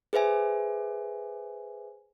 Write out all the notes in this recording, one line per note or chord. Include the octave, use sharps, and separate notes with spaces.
G#4 B4 C5 E5 G#5